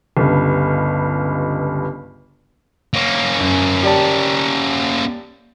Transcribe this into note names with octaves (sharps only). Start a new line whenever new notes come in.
G1 C#2 G2
A#3 C#4
F#2
G4 D5 A5